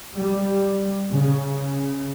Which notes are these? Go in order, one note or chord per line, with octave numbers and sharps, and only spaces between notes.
G3
C#3